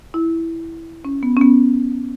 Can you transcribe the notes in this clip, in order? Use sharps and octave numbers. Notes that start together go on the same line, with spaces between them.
E4
C#4
B3
C#4
B3